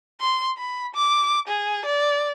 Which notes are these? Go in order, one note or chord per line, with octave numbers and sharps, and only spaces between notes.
C6
B5
D6
G#4
D5